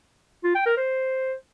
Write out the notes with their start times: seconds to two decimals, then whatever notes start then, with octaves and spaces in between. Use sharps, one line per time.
0.44 F4
0.55 G5
0.66 A#4
0.77 C5